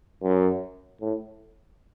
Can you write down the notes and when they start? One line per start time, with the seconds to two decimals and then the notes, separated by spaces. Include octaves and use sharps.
0.23 F#2
1.01 A2